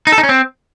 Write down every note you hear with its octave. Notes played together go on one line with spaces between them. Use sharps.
D#4
A4
D#4
C#4
C4